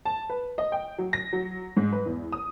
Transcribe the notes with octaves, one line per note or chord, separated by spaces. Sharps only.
A5
B4
D#5
G5
F#3
A#6
F#3
G#2
B4
E2
D#6